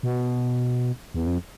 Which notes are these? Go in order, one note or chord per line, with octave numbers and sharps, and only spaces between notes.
B2
E2
F2